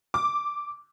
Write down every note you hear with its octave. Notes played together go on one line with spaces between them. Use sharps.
D6